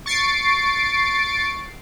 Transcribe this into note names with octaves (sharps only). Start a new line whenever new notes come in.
C#6 A6 C7 D7